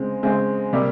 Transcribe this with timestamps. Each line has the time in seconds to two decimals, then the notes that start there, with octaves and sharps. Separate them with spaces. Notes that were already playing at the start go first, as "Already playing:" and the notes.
Already playing: C#3 G#3 C4
0.23 C#3 G#3 C4
0.73 C3 G3 A#3